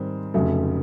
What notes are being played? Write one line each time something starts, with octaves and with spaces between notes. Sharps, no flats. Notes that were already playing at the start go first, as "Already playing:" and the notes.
Already playing: G#2 D#3 G3 C4
F1 F2 C#3 F#3 A3